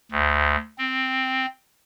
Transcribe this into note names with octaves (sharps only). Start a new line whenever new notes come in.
D2
C4